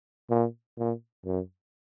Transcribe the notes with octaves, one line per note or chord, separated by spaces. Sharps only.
A#2
A#2
F#2